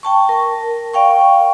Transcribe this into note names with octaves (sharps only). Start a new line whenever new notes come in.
G5 A5 C#6
A#4
D5 F5 G5 C#6